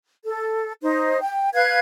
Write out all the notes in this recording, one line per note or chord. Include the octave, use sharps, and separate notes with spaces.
A4
D#4 C5
G5
B4 F5 F#6 G#6